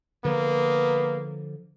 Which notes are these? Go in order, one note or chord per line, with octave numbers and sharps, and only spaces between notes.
D3 F3 A#3 B3